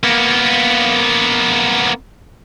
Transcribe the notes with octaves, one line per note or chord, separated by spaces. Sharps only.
A#3 B3